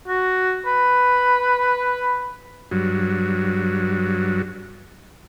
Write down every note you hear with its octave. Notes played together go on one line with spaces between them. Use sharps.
F#4
B4
G2 F#3